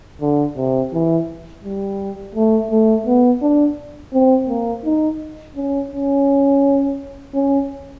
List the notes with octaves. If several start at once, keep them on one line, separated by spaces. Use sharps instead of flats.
D3
C3
E3
G3
A3
A3
B3
D4
C4
A#3
D#4
C#4
C#4
C#4